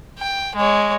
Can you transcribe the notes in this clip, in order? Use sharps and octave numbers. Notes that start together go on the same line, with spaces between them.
G5
G#3 C#5